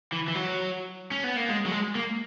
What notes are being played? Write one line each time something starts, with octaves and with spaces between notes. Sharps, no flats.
E3
E3
F#3
C#4
B3
A#3
G#3
F#3
G#3
A#3